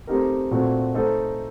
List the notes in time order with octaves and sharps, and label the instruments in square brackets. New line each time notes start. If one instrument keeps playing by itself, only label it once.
[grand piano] A3 C4 D#4 G4 A#4
A#2 A3 C4 F#4
A3 D#4 A4 C5 D#5